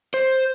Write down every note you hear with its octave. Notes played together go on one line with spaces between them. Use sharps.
C5